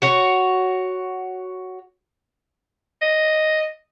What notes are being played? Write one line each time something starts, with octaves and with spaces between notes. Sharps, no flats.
F#4 C#5
D#5